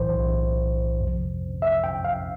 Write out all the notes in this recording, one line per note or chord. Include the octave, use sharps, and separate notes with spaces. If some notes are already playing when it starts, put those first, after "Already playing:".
Already playing: B1 A2 E3 C5
F2 C3 F3
E5
G5
F5